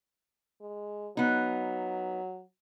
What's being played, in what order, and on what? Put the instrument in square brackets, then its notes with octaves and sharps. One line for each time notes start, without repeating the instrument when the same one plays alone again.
[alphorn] G#3
[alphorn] F#3 [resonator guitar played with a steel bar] B3 D#4